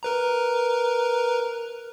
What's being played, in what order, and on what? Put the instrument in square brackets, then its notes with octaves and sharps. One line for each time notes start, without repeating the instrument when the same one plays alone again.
[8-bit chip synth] A#4 B4 A#5